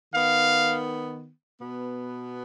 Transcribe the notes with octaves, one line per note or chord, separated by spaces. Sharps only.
D#3 B3 F5
B2 B3